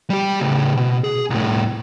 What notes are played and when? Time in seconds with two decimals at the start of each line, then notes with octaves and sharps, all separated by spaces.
0.10 G3 G4
0.41 A2 C#3
0.77 B2
1.04 G#4
1.30 C2 A2